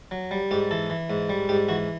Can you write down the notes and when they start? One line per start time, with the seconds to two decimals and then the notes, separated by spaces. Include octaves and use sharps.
0.11 F#3
0.31 G3
0.51 G#2 G4
0.71 E3 A4
0.90 E3
1.10 G#2
1.29 G3
1.49 G#2 G4
1.68 E3 F#4